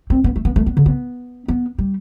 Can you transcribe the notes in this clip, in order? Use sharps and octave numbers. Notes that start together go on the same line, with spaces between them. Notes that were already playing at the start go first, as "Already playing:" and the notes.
C4
B3
A3
B3
A3
B3
D3
B3
B3
G3